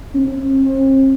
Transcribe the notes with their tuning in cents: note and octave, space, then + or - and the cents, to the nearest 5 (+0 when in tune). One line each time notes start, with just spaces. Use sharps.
C4 +45